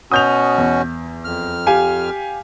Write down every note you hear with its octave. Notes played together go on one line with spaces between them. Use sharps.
B2 C#4 F#4 D#6 G6 F7
E2
F2 F6
G4 F5 G#5